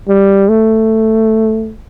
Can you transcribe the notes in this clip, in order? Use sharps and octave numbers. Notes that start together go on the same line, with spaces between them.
G3
A3